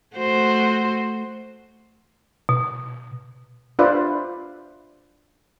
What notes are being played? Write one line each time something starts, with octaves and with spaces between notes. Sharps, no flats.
A3 F#4 C5
B2
D4 F4 B4 C5 D5 E5